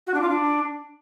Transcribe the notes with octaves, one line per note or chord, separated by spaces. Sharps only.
F#4
D4
F4
D4